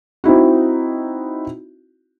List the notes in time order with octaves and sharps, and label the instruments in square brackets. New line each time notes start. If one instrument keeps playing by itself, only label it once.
[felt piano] C4 D#4 E4 F#4